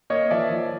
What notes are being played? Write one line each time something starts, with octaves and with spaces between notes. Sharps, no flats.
A#3 C#5 D#5
F3 D5 E5
F3